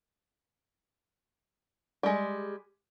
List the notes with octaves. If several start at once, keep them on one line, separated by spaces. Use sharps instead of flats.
G3 G#3